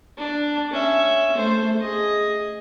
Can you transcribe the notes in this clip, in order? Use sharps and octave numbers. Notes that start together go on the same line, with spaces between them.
D4
C#4 E5
A3 C5
G#4 D#5